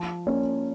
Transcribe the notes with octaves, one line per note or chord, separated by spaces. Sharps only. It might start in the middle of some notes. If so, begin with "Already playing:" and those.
Already playing: F3
A#3 C#4